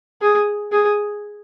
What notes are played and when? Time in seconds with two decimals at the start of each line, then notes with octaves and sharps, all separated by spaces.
0.22 G#4
0.72 G#4